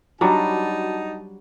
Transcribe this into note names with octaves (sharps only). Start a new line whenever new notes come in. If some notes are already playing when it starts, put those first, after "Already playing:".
F#3 G3 D4 D#4 F#4 A5